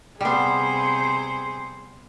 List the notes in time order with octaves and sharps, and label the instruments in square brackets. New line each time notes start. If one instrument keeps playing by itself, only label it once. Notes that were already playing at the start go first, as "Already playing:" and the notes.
[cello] C3 C5 [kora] G3 B3 [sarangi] G#4